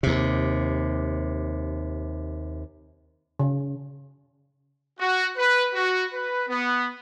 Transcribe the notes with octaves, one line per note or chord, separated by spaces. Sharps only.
D#2 C3
C#3
F#4
B4
F#4
B4
B3